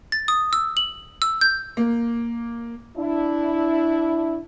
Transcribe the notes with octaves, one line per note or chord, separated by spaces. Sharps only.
A6
D#6
E6
F#7
E6
G6
A#3
D4 E4